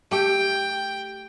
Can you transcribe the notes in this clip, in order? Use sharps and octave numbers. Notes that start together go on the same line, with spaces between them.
A3 G4 G5